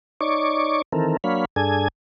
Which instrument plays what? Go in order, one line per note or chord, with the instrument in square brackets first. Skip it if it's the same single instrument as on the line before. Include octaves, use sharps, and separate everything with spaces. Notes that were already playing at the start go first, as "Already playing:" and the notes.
[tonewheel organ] D#4 C#5 D5 C#6 D6
D#3 E3 C4 A4 A#4
F#3 A#3 D4 C#5 F5 B5
G2 D4 G#4 A4 G#5 G#6